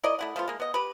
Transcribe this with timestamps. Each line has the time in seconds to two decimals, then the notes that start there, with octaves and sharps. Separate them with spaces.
0.03 E4 A#4 D5 D#5
0.19 A3 E4 F#5
0.36 F3 A3 B3 F4
0.48 G#3 A#3
0.60 B3 D#5
0.74 G4 B4